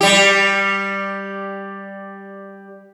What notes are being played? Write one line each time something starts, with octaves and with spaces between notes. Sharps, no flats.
G3 G4